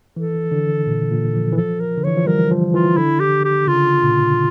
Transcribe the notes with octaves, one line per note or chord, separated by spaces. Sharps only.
E3 A4
D3
A#2
A#2
F3
E3
F3 A4
A#4
D3
E3 C#5
F3
G3 A#4
F3
E3 F4
D3 E4
G4
G4
C#3 F4
A#2